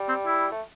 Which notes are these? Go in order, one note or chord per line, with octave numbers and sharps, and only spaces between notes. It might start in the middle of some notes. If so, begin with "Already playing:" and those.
Already playing: G3
C4
E4
A3